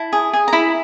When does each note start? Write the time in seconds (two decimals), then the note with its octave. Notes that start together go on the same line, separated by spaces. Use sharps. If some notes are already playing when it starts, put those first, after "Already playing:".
Already playing: E4 A5
0.13 G#4
0.33 G#4
0.48 A#5
0.53 E4 B5